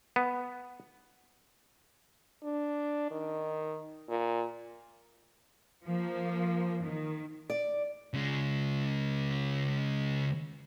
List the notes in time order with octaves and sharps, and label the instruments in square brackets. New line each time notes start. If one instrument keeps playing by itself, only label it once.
[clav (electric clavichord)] B3
[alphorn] D4
D#3
A#2
[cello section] F3 A#3
D#3
[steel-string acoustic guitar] D5
[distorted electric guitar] C#3 G#3